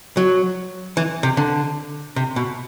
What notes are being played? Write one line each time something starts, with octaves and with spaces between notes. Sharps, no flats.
F#3
E3
C3
D3
C3
B2